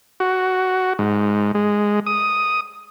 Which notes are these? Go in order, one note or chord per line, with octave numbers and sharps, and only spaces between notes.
F#4
G#2
G#3
D#6